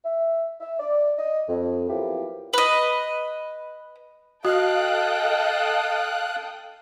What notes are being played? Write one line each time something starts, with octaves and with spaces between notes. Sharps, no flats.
E5
E5
D5
D#5
F2
F3 F#3 A#3 B3 E4 G4
B4 D#5
F#4 A4 D#5 F5 G5 D#6 F#6